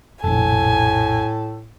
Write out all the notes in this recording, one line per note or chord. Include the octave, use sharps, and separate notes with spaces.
F1 A#1 A2 A4 G#5